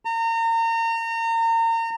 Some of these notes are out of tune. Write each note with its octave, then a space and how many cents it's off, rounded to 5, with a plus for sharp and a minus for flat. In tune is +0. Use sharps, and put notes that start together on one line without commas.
A#5 -35